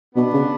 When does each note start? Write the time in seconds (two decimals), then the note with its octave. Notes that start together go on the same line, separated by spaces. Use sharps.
0.15 B2 B3 D4
0.34 C#3